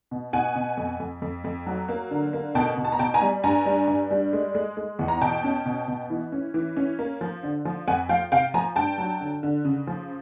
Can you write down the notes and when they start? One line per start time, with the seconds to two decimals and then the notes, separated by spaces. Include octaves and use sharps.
0.11 B2
0.33 B2 F#5 G#5
0.55 B2
0.77 F2
1.00 F2
1.22 F2
1.44 F2
1.66 F#3
1.89 A#3
2.11 D3
2.33 A#3
2.55 B2 G5 A5
2.77 B2
2.85 A5
2.92 A#5
2.99 B2 G5 A5
3.14 G#5 A#5
3.22 G3
3.44 G2 G#5 A#5
3.66 G3
3.88 G2
4.11 G3
4.33 G#3
4.55 G#3
4.77 G#3
4.99 E2
5.08 A#5
5.21 B2 G5 A5
5.44 C#4
5.66 B2
5.88 B2
6.10 E3
6.32 C#4
6.54 E3
6.77 C#4
6.99 A#3
7.21 F3
7.43 D3
7.65 F3
7.88 F2 F#5 G#5
8.09 F3 F5 G5
8.32 C3 F5 G5
8.54 F3 G#5 A#5
8.76 G2 G5 A5
8.98 F#3
9.21 D3
9.43 D3
9.65 C#3
9.87 F3